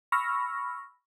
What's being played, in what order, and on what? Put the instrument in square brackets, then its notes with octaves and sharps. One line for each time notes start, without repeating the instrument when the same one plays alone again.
[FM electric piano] B5 C#6 E6 F6 A#6